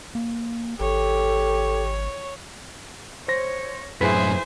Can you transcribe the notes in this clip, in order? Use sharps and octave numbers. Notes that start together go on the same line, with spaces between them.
A#3
G#1 G4 A4 C#5
C5 C#5 A#6
F#2 A2 E4 G#4 B4 C5 G#5 B6